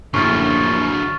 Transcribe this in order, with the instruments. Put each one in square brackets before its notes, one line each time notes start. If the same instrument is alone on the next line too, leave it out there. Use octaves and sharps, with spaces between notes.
[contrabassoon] A#1 [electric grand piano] F#2 A2 [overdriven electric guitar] D3 F#3 [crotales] C#6 F6 A6